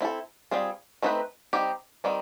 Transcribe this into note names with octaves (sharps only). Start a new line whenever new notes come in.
C4 E4 A4
G3 C4 F4 G#4
A3 C4 D#4 G#4 B4
G3 C4 D#4 G4
D#3 G3 C4 D#4